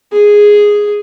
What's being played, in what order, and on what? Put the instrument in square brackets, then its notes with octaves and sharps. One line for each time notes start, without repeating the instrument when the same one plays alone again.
[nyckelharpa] G#4